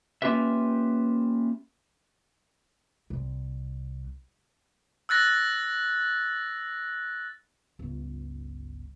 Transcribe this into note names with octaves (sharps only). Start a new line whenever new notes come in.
A#3 C#4 F4 G4 B4 E5
C2
E6 F#6 A6 A#6
G1 C#2